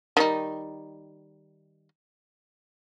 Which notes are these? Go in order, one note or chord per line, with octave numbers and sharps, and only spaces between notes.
D#3 G3 D#4